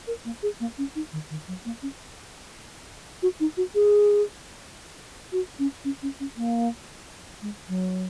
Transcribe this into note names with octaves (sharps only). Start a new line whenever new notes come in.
A#4
A#3
G#4
A#3
C#4
D#4
D#3
D#3
F#3
A#3
C#4
F#4
D#4
F#4
G#4
F#4
C#4
C#4
C#4
C#4
A#3
G#3
F#3